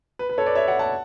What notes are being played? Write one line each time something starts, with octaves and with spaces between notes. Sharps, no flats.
B4
B4
A4 C#5
B4 D5
C#5 E5
D5 F#5
F#5 A5